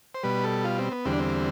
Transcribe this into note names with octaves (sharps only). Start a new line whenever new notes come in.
C5
B2 G3 B4
A4
F4
C4
B3
E2 D3 G3 C4
D4
C4